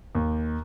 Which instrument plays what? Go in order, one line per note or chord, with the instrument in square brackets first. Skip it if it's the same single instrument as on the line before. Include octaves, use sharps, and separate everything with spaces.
[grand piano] D#2